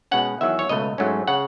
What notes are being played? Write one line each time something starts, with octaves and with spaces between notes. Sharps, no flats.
B2 G#3 C#4 F#5
E2 D#3 F#3 E5
C#5
C#2 B2 A3 D#5
G#2 F#3 A3 C#4
C#3 F#5